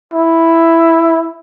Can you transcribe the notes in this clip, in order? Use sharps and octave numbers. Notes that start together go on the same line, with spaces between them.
E4